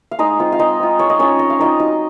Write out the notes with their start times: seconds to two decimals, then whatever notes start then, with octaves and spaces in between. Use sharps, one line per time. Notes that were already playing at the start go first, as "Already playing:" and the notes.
0.11 F5
0.19 G#3 D#4 D#5
0.39 C4 F4
0.52 F5
0.59 G#3 D#4 D#5
0.80 C4 F4
0.99 G#3 C#5
1.10 D#5
1.19 C4 C#4 F4 C#5
1.39 G#3 D#5
1.50 F5
1.59 C4 D#4 F4 D#5
1.79 F#3 D#4 D#5